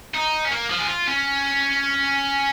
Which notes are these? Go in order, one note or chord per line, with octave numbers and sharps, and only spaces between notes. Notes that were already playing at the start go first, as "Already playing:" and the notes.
D#4
C#4
A#3
F3
G#4
F4
C#4